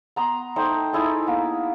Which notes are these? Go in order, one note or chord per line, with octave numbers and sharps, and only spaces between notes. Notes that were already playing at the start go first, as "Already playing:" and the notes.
B3 A#5 C6 D#6
A3 D#4 C5 G5
D#4 E4 G#4 A4
A#3 B3